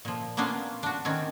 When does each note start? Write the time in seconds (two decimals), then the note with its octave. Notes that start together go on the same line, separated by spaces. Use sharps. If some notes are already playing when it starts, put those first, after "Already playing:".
0.05 A#2 F3
0.37 A#3 B3 C#4 D4 F4
0.83 D4 F#4
1.05 D#3 C4 C#4